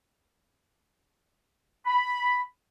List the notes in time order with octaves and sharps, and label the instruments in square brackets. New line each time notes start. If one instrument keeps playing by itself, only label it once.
[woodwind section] B5